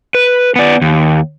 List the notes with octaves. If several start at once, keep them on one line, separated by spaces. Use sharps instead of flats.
B4
B3 D5
D#2